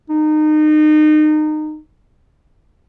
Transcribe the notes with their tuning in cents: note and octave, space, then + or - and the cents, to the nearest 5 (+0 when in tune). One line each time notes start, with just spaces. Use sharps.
D#4 -25